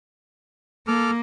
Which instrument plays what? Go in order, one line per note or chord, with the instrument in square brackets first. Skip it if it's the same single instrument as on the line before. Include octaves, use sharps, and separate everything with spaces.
[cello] A#3 [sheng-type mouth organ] A4 D6 F6